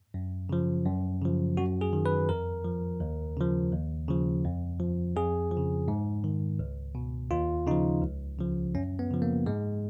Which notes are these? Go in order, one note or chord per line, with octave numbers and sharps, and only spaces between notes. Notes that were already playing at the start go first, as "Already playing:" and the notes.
F#2
C#3 F3
F#2
C#3 F3
F#2 F#4
G#4
D#3
B4
F2 A#4
F3
D#2
C#3 F3
D#2
C#3 F3
F2
F3
F2 G#4
F3
C#3
G#2
D#3
C#2
B2
D#2 F4
C#3 F3 D#4
C#2
C#3 F3
F#2 C#4
B3
C#3 F3
A#3
G#2 G#3